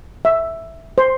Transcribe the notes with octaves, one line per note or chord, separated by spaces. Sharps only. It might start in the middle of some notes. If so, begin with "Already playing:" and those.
E5
C5